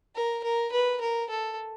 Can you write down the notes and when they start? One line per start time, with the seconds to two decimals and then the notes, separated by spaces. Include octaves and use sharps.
0.15 A#4
0.44 A#4
0.72 B4
1.01 A#4
1.30 A4